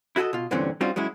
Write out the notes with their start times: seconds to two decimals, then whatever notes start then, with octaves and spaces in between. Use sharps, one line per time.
0.16 E4 F#4 G#4 A4 D#5
0.33 B2 F4
0.51 G2 A#2 D3 E3 C4 C#4
0.81 G3 C4 C#4 D#4 F4 F#4
0.96 F#3 G#3 C#4 E4